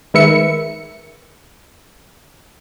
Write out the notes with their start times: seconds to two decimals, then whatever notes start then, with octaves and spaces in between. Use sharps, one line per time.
0.14 D#3 G#3 A#4 B4 E5 C#7